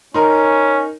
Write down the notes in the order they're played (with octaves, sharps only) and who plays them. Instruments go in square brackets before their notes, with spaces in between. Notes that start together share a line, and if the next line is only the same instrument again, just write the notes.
[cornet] C#4 [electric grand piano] D#4 A#4 [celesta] A#5 C6